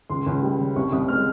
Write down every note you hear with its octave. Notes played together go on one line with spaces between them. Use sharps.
C#2 C6
C#2
G3
C#3
C2 C#6
C2 D#6
G#3 F6